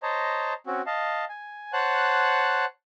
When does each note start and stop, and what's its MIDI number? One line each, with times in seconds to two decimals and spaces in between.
0.03 0.54 72
0.03 0.54 73
0.03 0.54 75
0.03 0.54 81
0.03 0.54 82
0.67 0.82 60
0.67 0.82 61
0.67 0.82 66
0.86 1.25 75
0.86 1.25 77
0.86 1.25 81
1.29 1.72 80
1.73 2.65 72
1.73 2.65 73
1.73 2.65 78
1.73 2.65 81
1.73 2.65 90